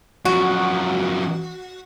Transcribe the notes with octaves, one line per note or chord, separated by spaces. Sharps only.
F#2 F3 F#4